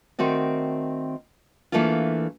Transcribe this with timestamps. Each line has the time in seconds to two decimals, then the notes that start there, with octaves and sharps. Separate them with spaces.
0.19 D#3 A3 C4 F#4 D5
1.72 E3 A3 A#3 D4 F4